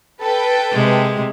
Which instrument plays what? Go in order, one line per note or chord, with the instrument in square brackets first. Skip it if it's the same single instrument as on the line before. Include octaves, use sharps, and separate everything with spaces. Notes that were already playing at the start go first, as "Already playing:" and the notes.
[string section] A4 B4 G5
[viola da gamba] C3 G#3